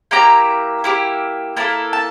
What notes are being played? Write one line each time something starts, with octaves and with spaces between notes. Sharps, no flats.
A#3 E4 G4 A#5
A#3 E4 G4
A#3 E4 A4 A5
A5